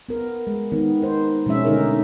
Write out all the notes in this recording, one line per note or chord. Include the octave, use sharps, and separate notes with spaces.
B3 A#4
G#3
D#3 B3
D#4 C5
B2 F3 G#3 C#4 E5
D3 D#3 A3 D#4 G#4 A#4